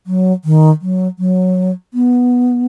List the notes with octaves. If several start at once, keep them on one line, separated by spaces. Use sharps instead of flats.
F#3
D#3
F#3
F#3
B3